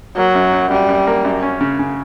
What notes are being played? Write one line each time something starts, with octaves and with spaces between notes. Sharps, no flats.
F#3 A#3
F#2
F#2
F#2 G3
F#2
A#3
F#2
C#4
C#3
C#3